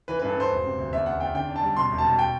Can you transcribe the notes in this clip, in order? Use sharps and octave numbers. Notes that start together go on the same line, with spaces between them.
E3 B4
G2 B4
A4
G2 C5
E1
C3
D2
E2 E5
E2 F#5
E2 G5
D3 G5
D4
A5
G3
B2 C6
E1
A5
B2
G5